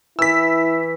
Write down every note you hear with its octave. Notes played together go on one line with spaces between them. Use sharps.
E3 E4 E6 B6